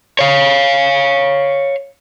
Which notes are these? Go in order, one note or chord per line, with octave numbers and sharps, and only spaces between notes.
C#5 F5